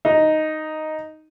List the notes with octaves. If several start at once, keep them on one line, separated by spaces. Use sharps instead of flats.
D#4